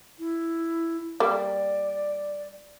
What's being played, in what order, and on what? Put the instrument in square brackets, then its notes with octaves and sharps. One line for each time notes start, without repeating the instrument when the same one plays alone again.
[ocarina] E4
[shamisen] G3 A#3 [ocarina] D5